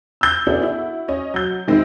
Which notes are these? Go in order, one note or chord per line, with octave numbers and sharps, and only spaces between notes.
E6 G6
B3 C#4 D4 E4 G#4 A4
E4 F#4
C#4 C#5 D#5
F#3 G6
D#3 G#3 C4 D#4 E4